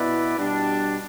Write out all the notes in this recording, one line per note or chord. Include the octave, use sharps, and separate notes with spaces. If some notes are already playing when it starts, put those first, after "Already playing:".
Already playing: B2 B3 E4 B4 D5
B2 G3 D4